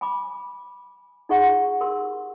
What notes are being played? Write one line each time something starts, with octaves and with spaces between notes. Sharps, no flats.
G#5 B5 D6
D#4 F4 G#4 D#5 F#5 C#6
G4 A#4 C6 E6